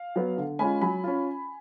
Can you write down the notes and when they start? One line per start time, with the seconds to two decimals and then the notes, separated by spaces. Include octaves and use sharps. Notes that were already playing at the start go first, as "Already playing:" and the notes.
Already playing: F5
0.16 F#3 B3
0.37 D3
0.59 G#3 C#4 F4 G#5 B5
0.81 F#3 G#5 B5
1.04 C#4 F4